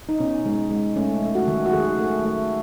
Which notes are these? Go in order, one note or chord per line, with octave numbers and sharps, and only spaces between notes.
D#4
B2 C#4
G#3
G#3
A3 C#4
A3
F#4
D#3
F#4
D#3 G#4
A3
A3